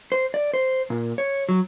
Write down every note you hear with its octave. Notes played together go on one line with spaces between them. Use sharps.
C5
D5
C5
A#2
C#5
F#3